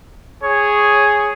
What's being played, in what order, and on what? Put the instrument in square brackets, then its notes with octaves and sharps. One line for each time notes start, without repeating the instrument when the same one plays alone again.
[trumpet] G#4 [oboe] C#5